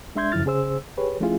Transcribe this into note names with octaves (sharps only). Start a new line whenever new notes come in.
G#3 D4 E5 C6 G6 G#6
F#2 C#3 F3 E4 F6 A6
C#3 G#4 C5 E6
G4 G#4 B4 C#5
F3 A3 C#4 E4 F4 G#4